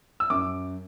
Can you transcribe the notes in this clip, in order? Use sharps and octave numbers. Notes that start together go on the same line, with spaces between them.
E6
F#2 D6